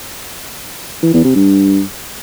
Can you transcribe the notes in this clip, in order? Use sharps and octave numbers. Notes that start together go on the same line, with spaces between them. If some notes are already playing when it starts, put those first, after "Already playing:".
E3
E2
C3
G2